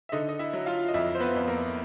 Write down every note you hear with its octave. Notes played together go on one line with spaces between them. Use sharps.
E5
D3 D#4 D#5
D#5
E4 E5
F#3
F4 F5
D#5
F2 E4 E5
C5
B3 B4
F2
A#3 A#4